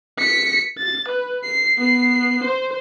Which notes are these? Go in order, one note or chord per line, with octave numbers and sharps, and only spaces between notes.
B6 C#7
A6
B4
C7
B3 C7
C5